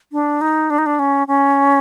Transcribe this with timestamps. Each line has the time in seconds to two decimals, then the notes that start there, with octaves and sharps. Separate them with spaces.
0.12 D4
0.41 D#4
0.70 D4
0.78 D#4
0.86 D4
0.99 C#4
1.28 C#4